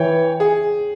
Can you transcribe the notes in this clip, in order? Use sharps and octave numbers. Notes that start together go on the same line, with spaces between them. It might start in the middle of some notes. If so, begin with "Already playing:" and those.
Already playing: E3 C#5 G5
G#4